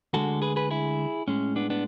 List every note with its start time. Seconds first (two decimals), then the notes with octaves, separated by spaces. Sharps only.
0.13 D2 D3 G#3 F#4 A4
0.42 G#4 B4
0.56 G#4 B4
0.71 E4 G#4
1.28 A2 G#3 C#4
1.56 B3 D4
1.70 B3 D4